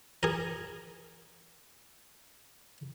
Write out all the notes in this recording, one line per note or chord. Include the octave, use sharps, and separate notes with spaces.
G#4 A#4